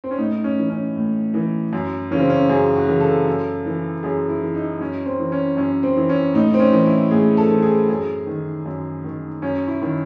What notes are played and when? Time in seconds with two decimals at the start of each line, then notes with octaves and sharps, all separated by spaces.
0.04 C4
0.11 C#4
0.18 A2 D#4
0.44 C#4
0.58 E3
0.70 C#4
0.96 A2
1.34 E3
1.73 F#2
2.11 C#3 E3 C#4
2.20 C4
2.30 C#4
2.49 F#2 G#4
2.76 F#4
2.88 C#3 E3
3.00 A4
3.26 F#2
3.66 E3
4.03 F#2 G#4
4.29 E4
4.41 E3
4.55 D#4
4.80 F#2 C#4
5.06 C4
5.20 E3
5.32 C#4
5.57 F#2 C#4
5.83 C4
5.97 E3
6.09 C#4
6.34 A2 D#4
6.54 C4
6.60 C#4
6.72 E3
6.86 E4
7.11 A2 G#4
7.37 A4
7.49 E3
7.63 G#4
7.89 F#2 G#4
8.26 D#3
8.66 F#2
9.04 D#3
9.42 F#2 C#4
9.68 E4
9.82 D#3 E4